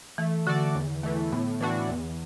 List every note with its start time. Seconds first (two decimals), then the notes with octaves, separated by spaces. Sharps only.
0.18 E3 A3
0.46 D3 F#4 A4 D5
0.75 E2
1.03 E3 A3
1.32 A2 B3
1.61 E3 D4 F#4
1.89 E2